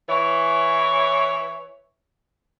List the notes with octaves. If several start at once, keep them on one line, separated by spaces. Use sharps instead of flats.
E3 C#5